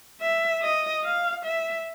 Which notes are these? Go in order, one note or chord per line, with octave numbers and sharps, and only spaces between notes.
E5
D#5
F5
E5